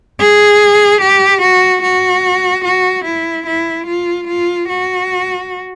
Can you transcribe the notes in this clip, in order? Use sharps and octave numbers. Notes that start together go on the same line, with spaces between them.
G#4
G4
F#4
F#4
F#4
E4
E4
F4
F4
F#4